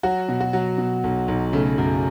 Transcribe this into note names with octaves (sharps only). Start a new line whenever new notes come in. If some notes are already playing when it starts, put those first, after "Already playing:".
F#3 F#4
B2
F#4
F#3
B2
B1
B1
C#3 A3
F#2